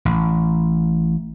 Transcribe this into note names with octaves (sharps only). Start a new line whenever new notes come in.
A1